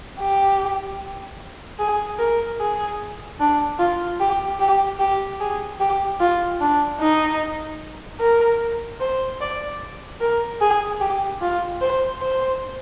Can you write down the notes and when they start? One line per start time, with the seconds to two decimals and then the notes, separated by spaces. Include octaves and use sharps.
0.19 G4
1.79 G#4
2.19 A#4
2.59 G#4
3.40 D4
3.79 F4
4.20 G4
4.60 G4
4.99 G4
5.40 G#4
5.80 G4
6.20 F4
6.61 D4
7.00 D#4
8.20 A#4
9.01 C5
9.41 D5
10.21 A#4
10.61 G#4
11.00 G4
11.41 F4
11.81 C5
12.21 C5